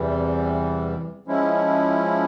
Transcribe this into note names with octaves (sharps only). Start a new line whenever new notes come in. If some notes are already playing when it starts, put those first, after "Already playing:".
Already playing: E2 C3 E3 G3
F3 G#3 C#4 E4